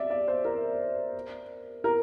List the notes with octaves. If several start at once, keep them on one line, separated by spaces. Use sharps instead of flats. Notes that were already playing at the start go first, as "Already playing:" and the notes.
Already playing: D5 E5
D5
C5
A#4
A#4